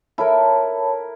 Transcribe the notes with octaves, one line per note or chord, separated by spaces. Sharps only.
E4 A4 A#4 C#5 A5 B5